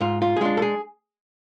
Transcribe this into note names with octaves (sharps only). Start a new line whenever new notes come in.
G#2 F4
F4
G#4
G#3 D4 F4
A4
G#4